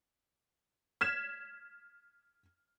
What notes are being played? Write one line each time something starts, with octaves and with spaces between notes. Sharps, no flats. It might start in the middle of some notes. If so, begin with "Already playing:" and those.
F6 G#6 B6 E7